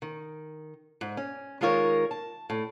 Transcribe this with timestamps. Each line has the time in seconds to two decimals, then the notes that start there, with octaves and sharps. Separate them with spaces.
0.02 D#3
1.01 G#2
1.17 C#4
1.61 D#3 G#3 D#4 F4 A#4 C#5
2.11 A5
2.50 A2